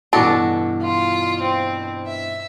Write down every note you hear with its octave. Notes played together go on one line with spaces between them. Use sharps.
G2 B2 E3 D4 F#4 A4
F4
C4
E5